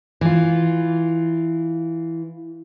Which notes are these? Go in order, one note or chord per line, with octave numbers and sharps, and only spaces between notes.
E3 F4